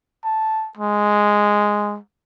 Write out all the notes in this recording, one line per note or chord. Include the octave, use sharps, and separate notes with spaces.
A5
G#3